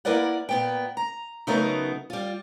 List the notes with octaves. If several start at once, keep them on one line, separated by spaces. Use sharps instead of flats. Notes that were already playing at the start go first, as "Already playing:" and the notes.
A#3 E4 A#4 B4 D5 F#5
A#2 B3 G5
A#5
C#3 F#3 A3 B3 D#4 A#4
G3 F4